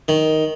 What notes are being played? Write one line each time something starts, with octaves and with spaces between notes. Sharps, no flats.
D#3